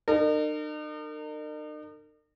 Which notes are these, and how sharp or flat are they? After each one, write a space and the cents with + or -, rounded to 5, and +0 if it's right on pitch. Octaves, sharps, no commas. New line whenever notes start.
D#4 -45 A#4 -35